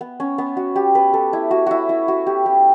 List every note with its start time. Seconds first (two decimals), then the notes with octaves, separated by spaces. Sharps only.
0.01 B3
0.20 C#4
0.38 B3
0.57 F#4
0.76 G4
0.95 B4
1.13 A4
1.33 E4
1.51 F#4
1.66 E4 F#4
1.89 E4
2.08 F#4
2.27 G4
2.46 G4